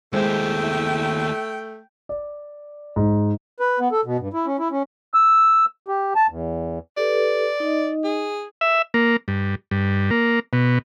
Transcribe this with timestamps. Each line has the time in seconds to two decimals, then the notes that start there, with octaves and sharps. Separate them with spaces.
0.13 D#2 G#3 A3 E4 C5 G5
2.09 D5
2.96 G#2
3.60 B4
3.80 B3
3.92 A4
4.05 B2
4.18 G2
4.34 E4
4.46 C#4
4.59 E4
4.71 C#4
5.14 E6
5.88 G4
6.15 A5
6.29 E2
6.97 G4 A4 B4 D5
7.60 D#4 D#5
8.04 G#4
8.61 E5
8.94 A#3
9.28 G2
9.71 G2
10.11 A#3
10.53 B2